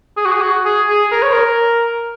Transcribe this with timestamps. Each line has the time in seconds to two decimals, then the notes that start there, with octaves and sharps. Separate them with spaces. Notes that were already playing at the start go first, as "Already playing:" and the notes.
0.17 G#4
0.25 F#4
0.32 G#4
0.41 F#4
0.65 G#4
0.89 G#4
1.12 A#4
1.22 C#5
1.33 A#4